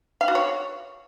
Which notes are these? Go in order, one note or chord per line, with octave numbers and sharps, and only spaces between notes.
F5
F#4
C#5